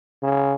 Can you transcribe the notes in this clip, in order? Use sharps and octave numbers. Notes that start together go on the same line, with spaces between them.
C#3